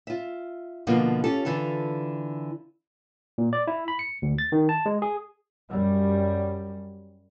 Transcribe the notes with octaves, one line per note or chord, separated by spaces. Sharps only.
F4 E5
B2 D3 F3 A#3 F4 F#4
C#4 F4 G4 A4
D3 E3 F4 A4
A#2
D5
E4
B5
C#7
D2
A6
D#3
A5
G#3
G#4
F#2 G3